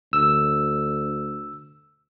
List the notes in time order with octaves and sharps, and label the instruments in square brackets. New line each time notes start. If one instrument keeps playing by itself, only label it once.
[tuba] D2 [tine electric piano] E6